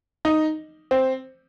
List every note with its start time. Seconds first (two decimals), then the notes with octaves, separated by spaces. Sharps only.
0.25 D#4
0.91 C4